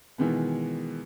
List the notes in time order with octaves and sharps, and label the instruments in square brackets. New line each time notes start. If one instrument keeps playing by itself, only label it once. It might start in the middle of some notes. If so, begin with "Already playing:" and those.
[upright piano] B2 D#3 E3 G#3 B3